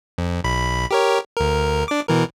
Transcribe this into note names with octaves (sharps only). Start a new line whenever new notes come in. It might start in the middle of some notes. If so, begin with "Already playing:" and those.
F2
B1 B5
G4 A#4 C#5
D2 A#4
D4 D6
B2 E3 A#4